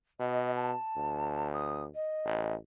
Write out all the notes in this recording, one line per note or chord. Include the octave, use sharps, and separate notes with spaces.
B2 D#5
A5
D2
D#6
D#5
A1